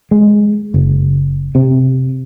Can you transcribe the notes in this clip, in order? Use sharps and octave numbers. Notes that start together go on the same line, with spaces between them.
G#3
F#1
C3